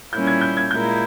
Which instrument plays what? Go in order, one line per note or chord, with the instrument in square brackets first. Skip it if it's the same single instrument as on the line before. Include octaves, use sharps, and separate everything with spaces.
[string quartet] A#2 G3 A#3 C#4 E4 [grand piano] G6
[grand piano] G#6
G6
G#6
[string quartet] A#2 G#3 E4 A#4 [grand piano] G6